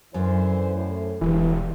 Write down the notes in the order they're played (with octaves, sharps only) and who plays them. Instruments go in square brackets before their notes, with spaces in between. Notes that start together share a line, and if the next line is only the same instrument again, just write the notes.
[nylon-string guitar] F#2 [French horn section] D3 E3 C5
[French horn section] A2
[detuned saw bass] E1 [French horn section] G2 [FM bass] E3